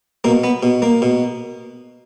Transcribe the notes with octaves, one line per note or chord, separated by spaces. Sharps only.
B2 A#3
B3
B2
A#3
B2